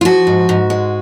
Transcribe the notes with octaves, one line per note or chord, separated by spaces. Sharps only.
F4
F3 F#4
G#2
G#2
G#3